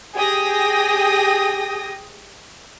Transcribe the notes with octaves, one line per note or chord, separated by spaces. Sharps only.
G4 G#4 G5 D#6 A#6